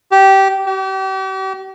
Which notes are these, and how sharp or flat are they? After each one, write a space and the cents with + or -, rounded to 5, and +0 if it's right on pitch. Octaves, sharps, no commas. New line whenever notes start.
G4 -15
G4 -40